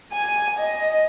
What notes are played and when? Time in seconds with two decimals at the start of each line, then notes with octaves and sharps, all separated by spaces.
0.12 G#5
0.59 D#5